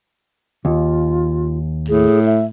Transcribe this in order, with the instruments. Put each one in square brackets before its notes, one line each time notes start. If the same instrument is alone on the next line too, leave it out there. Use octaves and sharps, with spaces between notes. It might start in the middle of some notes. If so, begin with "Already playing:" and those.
[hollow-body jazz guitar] D#2 [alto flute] F4
[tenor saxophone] A2 [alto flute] G#4
[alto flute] E5